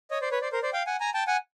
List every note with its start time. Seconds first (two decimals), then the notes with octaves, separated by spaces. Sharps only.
0.11 C#5 D#5
0.22 C5 D5
0.31 B4 C#5
0.42 C5 D5
0.52 A#4 C5
0.63 C5 D5
0.73 F5 G5
0.87 F#5 G#5
1.00 G#5 A#5
1.14 G5 A5
1.27 F#5 G#5